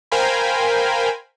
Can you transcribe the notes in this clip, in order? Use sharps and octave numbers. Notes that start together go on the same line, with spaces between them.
A#4 C5 F5 G5 G#5 B5